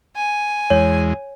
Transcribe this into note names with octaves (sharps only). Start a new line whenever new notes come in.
G#5
E2 G#3 C#5